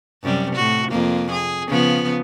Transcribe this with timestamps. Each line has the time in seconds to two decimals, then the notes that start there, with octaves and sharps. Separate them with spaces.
0.24 F#2 C3 G3
0.55 A2 F#4
0.91 F2 A#3
1.31 G#4
1.68 C#3 F3 B3